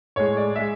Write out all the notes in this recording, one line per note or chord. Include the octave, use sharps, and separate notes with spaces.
A2 G#3 C#5
D5
G#3 E5